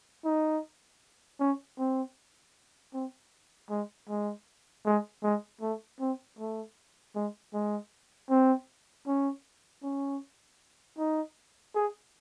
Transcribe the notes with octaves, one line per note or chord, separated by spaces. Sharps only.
D#4
C#4
C4
C4
G#3
G#3
G#3
G#3
A3
C4
A3
G#3
G#3
C4
C#4
C#4
D#4
G#4